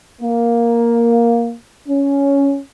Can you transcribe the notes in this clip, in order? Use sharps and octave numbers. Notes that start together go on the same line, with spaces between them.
A#3
C#4